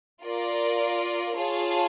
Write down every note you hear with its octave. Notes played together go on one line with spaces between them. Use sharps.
F4 A#4 D5
F4 G#4 C#5 F5 A5